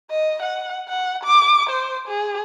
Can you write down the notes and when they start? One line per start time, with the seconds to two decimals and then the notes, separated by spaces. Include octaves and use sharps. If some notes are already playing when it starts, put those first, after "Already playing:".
0.11 D#5
0.42 F#5
0.89 F#5
1.24 D6
1.70 C5
2.08 G#4